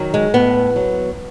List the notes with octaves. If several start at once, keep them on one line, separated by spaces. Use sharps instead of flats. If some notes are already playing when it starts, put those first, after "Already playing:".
Already playing: D#3 F#3
G#3
A2 B3
F#3